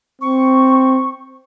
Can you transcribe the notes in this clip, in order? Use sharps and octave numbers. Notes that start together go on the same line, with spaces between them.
C4 C#6